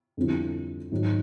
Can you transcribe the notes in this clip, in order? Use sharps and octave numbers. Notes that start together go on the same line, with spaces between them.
F2 D3 G3 C4 E4
G#2 D#3 F#3